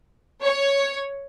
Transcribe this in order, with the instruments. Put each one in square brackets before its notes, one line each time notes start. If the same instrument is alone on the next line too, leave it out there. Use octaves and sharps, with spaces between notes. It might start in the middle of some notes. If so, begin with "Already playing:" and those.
[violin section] C#5